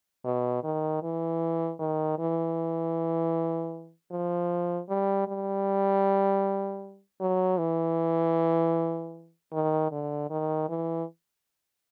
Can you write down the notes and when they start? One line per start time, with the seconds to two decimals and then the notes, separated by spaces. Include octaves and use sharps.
0.24 B2
0.64 D#3
1.03 E3
1.79 D#3
2.18 E3
4.11 F3
4.89 G3
5.28 G3
7.21 F#3
7.59 E3
9.52 D#3
9.92 D3
10.30 D#3
10.69 E3